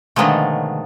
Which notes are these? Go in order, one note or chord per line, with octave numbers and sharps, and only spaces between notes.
B2 D3 D#3 F3 G#3 A3